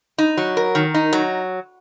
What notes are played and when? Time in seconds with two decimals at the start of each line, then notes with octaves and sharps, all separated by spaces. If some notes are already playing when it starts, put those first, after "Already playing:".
0.18 D#4
0.37 F#3
0.57 A#4
0.75 D#3
0.94 D#4
1.13 F#3